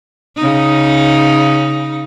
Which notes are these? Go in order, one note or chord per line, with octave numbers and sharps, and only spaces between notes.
C#3 D#4